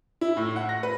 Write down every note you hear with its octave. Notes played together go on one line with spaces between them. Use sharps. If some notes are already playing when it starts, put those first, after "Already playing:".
E4
A2
F#5
A#6
B4